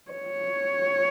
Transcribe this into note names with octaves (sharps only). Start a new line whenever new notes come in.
C#5